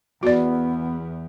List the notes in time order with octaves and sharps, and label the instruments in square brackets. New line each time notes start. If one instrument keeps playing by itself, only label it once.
[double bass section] E2 [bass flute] B3 [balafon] F#4 D5